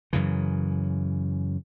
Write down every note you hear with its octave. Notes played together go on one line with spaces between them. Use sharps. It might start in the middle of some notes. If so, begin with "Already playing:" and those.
F#2 C#3 E3